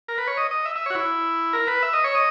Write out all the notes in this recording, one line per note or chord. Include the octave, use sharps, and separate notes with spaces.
A#4
B4
C#5
D#5
D#5
E5
E5
F#4 C#5
E4
A#4
B4
E5
D#5
C#5
D#5